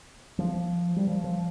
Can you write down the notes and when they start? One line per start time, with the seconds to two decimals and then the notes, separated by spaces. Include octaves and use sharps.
0.39 F3
0.96 G3
1.08 F3
1.24 F3